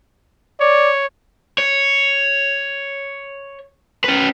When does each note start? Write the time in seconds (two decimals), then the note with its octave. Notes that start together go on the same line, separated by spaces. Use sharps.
0.60 C#5 D5
1.58 C#5
4.04 C#4 B4